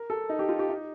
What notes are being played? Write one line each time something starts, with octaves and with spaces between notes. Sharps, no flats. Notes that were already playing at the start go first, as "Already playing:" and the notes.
Already playing: A#4
A4
D#4
G4
F4
G4
D#4